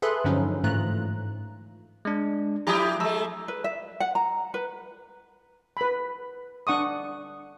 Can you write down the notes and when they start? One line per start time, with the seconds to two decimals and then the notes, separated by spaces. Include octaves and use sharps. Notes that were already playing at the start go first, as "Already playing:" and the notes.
0.02 G#4 A4 B4 E5 C6 F#6
0.24 G2 D3 F3 F#3 C#4 D#4
0.64 G#2 E3 A3 F4 A#5 F#6
2.05 G#3 D4
2.67 F3 E4 G4 A#5 B5 D#6
3.00 G#3 A3 A#5 E6
3.48 B4
3.64 E5
4.00 F#5
4.15 A#5
4.54 B4
5.77 B4 B5
6.67 D4 F#5 C#6 D#6